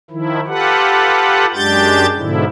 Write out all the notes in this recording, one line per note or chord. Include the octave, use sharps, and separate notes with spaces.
D#3 F3 E4
F4 G4 A4 B4 F#5
F#2 G#3 D4 G4 G6 A6
G#2 B2 D3 F3 E4